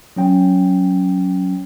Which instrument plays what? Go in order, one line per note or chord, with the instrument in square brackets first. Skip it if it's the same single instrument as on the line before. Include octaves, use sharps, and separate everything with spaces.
[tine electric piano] F#3 C#4 G5